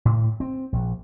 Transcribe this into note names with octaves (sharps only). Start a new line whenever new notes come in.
A2
C4
A#1